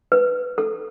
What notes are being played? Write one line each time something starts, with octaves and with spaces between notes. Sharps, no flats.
B4
A4